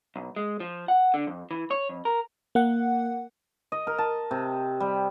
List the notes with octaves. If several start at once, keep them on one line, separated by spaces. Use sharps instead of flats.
B1
G#3
F3
F#5
D3
F2
E3
C#5
F2
A#4
A#3 F#5
D#5
A#4
A5
C3
G3